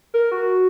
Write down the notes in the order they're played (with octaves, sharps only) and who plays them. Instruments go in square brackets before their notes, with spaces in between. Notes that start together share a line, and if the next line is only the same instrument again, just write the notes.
[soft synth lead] A#4
F#4